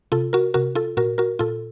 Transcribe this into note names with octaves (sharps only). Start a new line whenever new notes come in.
C3 F4 A4
F#4 A#4
C3 F#4 A#4
F4 A4
A#2 F#4 A#4
F#4 A#4
A#2 F4 A4